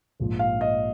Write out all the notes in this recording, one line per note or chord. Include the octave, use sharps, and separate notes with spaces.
A#1 G#2 F3
F5
D#5